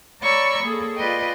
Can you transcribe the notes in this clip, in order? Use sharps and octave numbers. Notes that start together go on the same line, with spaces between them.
C#5 D5 A#5 B5 C#6 E6
A#3 G#4 A4
F4 B4 D5 D#5 G5